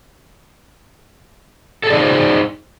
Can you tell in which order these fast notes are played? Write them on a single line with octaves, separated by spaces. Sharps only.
A4 G#4 D5 D#4 C5